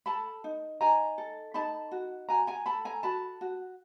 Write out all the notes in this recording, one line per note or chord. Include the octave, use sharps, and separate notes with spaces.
A4 A5 B5
D#4
D#4 G#5 A#5
A4
D#4 A5 B5
F#4
F#4 G#5 A#5
G#5 A#5
A4 A5 B5
G#5 A#5
F#4 A5 B5
F#4